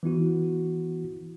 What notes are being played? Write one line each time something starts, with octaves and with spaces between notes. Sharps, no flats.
E3 B3 E4 F#4